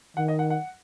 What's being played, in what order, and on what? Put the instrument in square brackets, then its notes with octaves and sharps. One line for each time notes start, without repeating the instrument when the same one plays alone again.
[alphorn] D#3 [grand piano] F#5
[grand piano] D#5
F#5
F#5